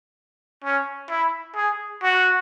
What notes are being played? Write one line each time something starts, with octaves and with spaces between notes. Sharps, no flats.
C#4
E4
G#4
F#4